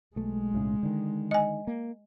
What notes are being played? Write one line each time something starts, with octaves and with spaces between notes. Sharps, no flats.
B1 G#3 A3
B1 A2 C#3
D3 D#3
D#5 G#5
A#3